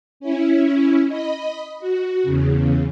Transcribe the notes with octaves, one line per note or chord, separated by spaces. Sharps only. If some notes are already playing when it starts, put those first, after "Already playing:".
C#4 E4
D#5 B5
F#4
E2 C#3